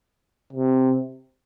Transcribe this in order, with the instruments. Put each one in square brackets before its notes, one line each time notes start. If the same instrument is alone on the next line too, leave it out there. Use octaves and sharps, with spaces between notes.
[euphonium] C3